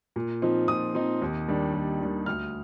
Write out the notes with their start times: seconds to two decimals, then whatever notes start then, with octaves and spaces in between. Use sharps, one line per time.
0.16 A#2
0.42 F3 C4 D#4
0.68 A#2 D#6
0.95 F3 C4 D#4
1.22 D#2
1.48 D#3 G3 D4
1.74 D#2
2.00 D#3 G3 D4
2.26 D2 F6